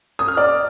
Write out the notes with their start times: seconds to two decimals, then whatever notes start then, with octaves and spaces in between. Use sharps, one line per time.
0.19 D#6
0.28 F6
0.37 D5